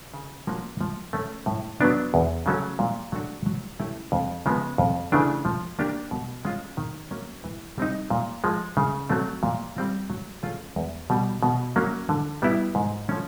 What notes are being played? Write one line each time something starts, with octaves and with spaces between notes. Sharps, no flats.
C#3
F3 A#3 C#4 F#4
F3
A3 C#4
A2
F#3 B3 D4
E2
C#3 F#3 A3 C#4
A#2
F#3 A3 D4 F#4
F#3
A3 C#4 E4 G4
F2
C#3 F3 G#3 B3
F2
C#3 E3 A3 D4
F3
A#3 D4 G4
B2
G#3 C#4 F4 G#4
D#3
F#3 A#3 C#4
E3
G3 C4 D#4
A#2
F3 G#3
C#3
F#3 A3 C4
A#2
G3 C4 F4
F#3
A3 C#4 F4 G#4
E2
B2 G3
B2
F#3 A#3 C#4
D3
G3 B3 E4 G4
G#2
F3 A3 C#4